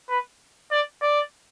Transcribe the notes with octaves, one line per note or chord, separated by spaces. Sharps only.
B4
D5
D5